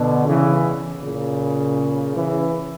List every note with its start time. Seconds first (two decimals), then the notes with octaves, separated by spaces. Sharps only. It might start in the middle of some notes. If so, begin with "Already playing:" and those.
Already playing: B2 D3
0.27 C#3 E3
1.02 A#2 C#3
2.16 C#3 E3